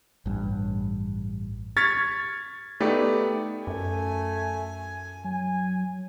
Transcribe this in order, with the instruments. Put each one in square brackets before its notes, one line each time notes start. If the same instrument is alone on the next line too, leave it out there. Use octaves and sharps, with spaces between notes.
[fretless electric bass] A1 G2
[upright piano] C#6 F6 G#6 A6 B6 C#7
A3 B3 D#4 G4 D5
[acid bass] F#2 [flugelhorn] A3 [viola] G#5
[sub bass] F#3 [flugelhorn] G#5